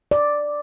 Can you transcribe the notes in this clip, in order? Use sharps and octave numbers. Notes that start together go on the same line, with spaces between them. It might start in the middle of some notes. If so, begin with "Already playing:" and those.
D5